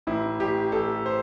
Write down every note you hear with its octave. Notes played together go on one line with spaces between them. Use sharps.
A1 E4
A1 G4
A1 A4
C5